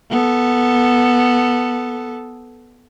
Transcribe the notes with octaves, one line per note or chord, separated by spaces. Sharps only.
B3 A4